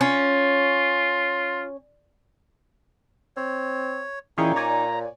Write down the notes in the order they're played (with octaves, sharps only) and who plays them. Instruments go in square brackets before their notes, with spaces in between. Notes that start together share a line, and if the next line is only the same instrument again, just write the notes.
[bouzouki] C#4 [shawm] F4
[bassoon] C4 [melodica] C#5
[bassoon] A#2 [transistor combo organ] E3 E4 G5 [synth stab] C#4 G#4 C#5 [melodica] D#4
[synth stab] C#5 D5 G#5 [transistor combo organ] A#5